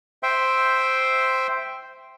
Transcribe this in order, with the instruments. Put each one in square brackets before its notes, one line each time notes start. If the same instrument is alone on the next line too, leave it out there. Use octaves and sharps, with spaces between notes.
[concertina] C5 E5 G5 C6